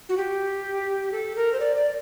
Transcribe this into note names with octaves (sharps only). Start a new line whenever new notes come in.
F#4
G4
A4
A#4
C5
D5
D5